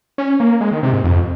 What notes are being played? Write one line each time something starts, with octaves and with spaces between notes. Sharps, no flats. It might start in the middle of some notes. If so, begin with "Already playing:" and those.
C#4
A#3
G#3
D#3
C3
G#2
F2